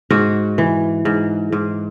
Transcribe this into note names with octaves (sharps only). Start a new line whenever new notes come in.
G#2 F#4
E3
G#2
G#2